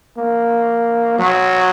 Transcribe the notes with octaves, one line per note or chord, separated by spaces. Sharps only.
A#3
F#3